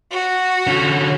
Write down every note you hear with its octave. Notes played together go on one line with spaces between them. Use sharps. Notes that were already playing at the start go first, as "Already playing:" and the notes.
F#4
D3 C#4